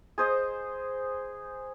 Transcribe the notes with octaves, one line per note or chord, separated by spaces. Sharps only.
G#4 C5 D#5